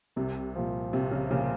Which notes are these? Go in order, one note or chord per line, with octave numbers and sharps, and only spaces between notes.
C2 C3
A#2 F3
C2 C3
C#3
A#2 C#3 F3